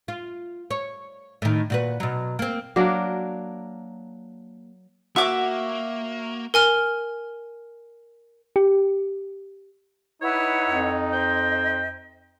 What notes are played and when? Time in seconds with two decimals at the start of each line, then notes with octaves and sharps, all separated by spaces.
0.08 F4
0.71 C#5
1.42 A2 D#3
1.70 A#2 F#4 B4
2.00 B2 F#3
2.39 A#3 C4
2.76 F#3 A#3 D4 A#4
5.16 A#3 F#4 E5 F#5 D6 C#7 D7
6.54 A#4 G#5 F6
8.56 G4
10.22 D#4 E4 B4 C#5 F#5
10.67 F2
11.13 C5 D#5 G5